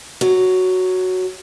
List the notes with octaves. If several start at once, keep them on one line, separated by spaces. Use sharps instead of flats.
F#3